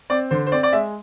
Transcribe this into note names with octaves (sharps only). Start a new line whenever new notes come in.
C4 D5
D3 C5
C5
C4 D5
D5
G#3 E5